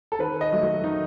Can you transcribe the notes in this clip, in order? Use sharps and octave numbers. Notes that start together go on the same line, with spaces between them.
A4
D#3 B4
D#5
F#3 A3
F#4
D#3 D#4